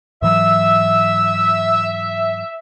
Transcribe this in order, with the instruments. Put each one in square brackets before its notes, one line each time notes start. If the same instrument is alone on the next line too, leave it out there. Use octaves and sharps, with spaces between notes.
[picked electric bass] G#2 E3 F#3 [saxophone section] E5 [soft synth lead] E6